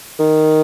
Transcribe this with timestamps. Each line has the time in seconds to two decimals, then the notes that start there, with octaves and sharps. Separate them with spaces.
0.20 D#3